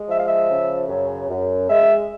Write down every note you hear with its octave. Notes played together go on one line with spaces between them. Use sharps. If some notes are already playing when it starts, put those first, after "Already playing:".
Already playing: G#3
F3 E5
F5
E5
C#3
F#2
F#2
G#3 E5